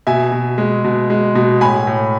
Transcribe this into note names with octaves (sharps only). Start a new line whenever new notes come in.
B2 E5 G#5
B2
G#3
B2
G#3
B2
A2 G#5 B5
A2